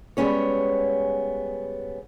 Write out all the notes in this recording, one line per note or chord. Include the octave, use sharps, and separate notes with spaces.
G3 G#3 B3 C#4 C#5